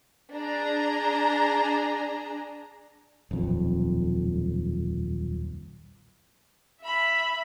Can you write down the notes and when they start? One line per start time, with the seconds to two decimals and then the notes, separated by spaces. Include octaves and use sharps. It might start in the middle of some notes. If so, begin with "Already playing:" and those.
0.32 D4 G#4 A#5
3.31 D#1 B1 F2
6.81 E5 B5